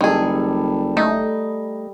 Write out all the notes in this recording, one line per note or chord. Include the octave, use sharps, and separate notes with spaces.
F#1 D#3 G3 G#4 A4
A3 D#4